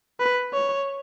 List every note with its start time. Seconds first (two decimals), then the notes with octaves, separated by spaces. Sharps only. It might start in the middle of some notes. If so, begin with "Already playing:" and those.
0.20 B4
0.53 C#5